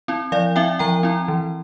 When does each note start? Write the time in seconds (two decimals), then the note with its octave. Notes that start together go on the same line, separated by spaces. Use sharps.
0.08 C4 E4
0.32 F3 D5 F5
0.56 C4 E4 E5 G5
0.79 F3 G5 A#5
1.03 C4 E4
1.28 E3